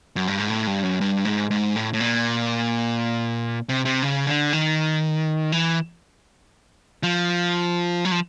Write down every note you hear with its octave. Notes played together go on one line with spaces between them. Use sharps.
F#2
G2
G#2
A2
G2
F#2
G2
G#2
G#2
A2
A2
A#2
C3
C3
C#3
D3
D#3
E3
F3
F#3
F3